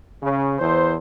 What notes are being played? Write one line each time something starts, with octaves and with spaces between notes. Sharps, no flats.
C#3
E2 E3 C5